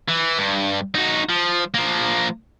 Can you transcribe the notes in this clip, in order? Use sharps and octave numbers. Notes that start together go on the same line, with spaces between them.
E3
G2
D#4 F#4
F3
F3 A#3